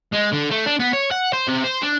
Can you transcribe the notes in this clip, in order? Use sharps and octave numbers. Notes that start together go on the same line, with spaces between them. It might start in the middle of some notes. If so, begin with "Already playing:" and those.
G#3
D3
A3
D4
B3
C#5
F#5
C5
C3
C5
D4